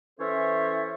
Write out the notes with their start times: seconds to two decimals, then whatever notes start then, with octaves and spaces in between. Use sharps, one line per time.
0.20 E3 C#4 A4 C5 C#5 E5